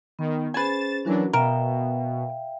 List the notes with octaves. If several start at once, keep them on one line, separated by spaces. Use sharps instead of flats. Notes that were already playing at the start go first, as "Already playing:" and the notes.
D#3 B3
C#4 G#4 B4 C5 G#5 A6 E7
E3 F#3 C#4 D4 F#4 A#4
B2 A#4 E5 F5 G5